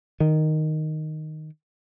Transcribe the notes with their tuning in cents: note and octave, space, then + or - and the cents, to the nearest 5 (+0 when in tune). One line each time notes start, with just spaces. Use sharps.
D#3 -5